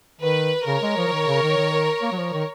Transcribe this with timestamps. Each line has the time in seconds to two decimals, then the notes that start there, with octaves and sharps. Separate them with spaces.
0.21 D#3 B4
0.67 C#3 A#4 C#5
0.82 G#3
0.97 F3
1.08 F3
1.12 D#3
1.27 C#3
1.42 D#3
1.57 D#3
2.02 A#3
2.12 F#3
2.18 F3
2.33 D#3